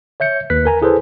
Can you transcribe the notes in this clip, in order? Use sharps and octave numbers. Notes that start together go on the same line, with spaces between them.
C#5 E5 G6 C#7
D#2 B4 F#6 B6
A#4 G#5 A#5
E4 G#4 A4 B4 C5